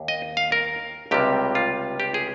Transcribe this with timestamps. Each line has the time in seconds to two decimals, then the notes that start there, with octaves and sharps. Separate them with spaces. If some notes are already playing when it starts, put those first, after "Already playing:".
Already playing: D#2
0.08 D#5
0.37 F5
0.52 A#4
1.11 C#2 C3 G3 G4
1.55 F4
2.00 G4
2.14 G#4